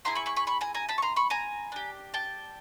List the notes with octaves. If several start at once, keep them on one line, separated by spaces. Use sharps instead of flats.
C4 E4 G#4 A#5 C6
B5 C#6
B5 C#6
B5 C#6
B5 C#6
G#5 A#5
G#5 A#5
A5 B5
C#6
A#5 C6
B5 C#6
G#5 A#5
D4 G4
G5 A5